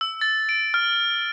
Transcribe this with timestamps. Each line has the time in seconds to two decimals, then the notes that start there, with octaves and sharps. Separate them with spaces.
0.01 E6
0.21 A6
0.49 D7
0.74 F6